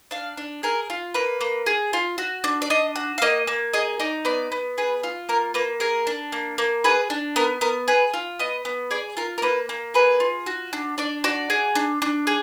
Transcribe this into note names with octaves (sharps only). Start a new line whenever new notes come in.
D4 F5
D4
G#4 A#4
F4
A#3 B4
A#3
G#4
F4
F#4
D4
D5
D4 D#5
F#4
F5
A#3 D#5
A#3
G#4 D#5
D#4 D5
B3 D5
B3
G#4 B4
F4
A#3 A#4
A#3 B4
G#4 A#4
D4
A#3
A#3
G#4 B4
D4
B3 A#4
B3 A#4
G#4 B4
F4
B3 D#5
B3
G#4 D5
F4 A#4
A#4
A#3 B4
A#3
G#4 B4
F4
F#4
D4
D4 D5
F#4 D5
G#4
D4
D4
G#4